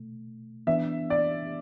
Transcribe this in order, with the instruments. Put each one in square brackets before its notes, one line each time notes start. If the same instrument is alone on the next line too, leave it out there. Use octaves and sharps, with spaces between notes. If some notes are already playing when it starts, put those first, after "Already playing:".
Already playing: [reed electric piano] B2 A3
[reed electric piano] E3 B3 D4 [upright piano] E5
[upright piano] D5